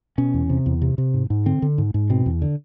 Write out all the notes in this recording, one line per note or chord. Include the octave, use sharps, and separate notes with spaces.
B2 C#4
E2
C3
E2
C3
C3
G#2
G#2
D3 C4
D3
G#2
G#2
B2 C4
E2
D3